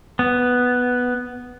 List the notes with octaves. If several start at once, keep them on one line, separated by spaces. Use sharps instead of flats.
B3